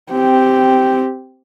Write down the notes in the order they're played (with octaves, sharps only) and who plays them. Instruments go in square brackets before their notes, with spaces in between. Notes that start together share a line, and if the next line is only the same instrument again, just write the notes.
[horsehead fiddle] C4 G4